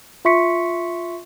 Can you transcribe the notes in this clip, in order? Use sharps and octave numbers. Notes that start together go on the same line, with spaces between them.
F4 E5 C6 C#6 B6 C#7